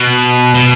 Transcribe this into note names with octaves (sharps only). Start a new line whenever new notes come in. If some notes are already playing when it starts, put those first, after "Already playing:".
Already playing: B2
B2